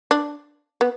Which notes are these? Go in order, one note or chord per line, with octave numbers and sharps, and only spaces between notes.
D4
B3